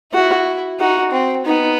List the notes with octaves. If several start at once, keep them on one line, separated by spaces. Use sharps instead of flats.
E4 F#4
D#4 F#4
C4
B3 D#4